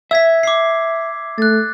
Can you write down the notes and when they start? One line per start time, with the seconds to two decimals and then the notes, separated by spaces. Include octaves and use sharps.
0.11 E5 E6 G#6 B6
0.43 D6 E6 C7
1.38 A3 F#6 A6